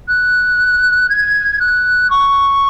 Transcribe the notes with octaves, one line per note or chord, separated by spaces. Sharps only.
F#6
G#6
F#6
C#6